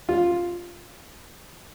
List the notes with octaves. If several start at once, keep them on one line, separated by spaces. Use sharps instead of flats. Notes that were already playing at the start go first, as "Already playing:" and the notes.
F4